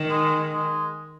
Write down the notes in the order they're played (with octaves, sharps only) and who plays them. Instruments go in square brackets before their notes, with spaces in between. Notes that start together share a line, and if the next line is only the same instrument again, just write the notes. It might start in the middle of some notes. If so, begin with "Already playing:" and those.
Already playing: [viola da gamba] D#3
[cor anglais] G#3
G#3